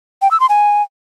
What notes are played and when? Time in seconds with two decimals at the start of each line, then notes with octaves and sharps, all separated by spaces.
0.22 G5
0.31 E6
0.40 C6
0.49 G#5